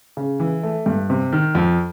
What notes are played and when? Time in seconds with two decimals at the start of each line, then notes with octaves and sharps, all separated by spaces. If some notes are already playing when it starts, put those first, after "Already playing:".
0.17 C#3
0.40 E3
0.63 A3
0.86 G2
1.10 C3
1.33 D#3
1.55 F2